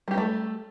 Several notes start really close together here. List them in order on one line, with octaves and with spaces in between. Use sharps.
G3 G4 A#3 A3